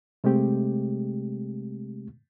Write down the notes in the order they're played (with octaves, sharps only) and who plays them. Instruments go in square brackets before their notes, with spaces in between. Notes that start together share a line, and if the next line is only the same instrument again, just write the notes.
[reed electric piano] C3 G#3 A3 C4 G4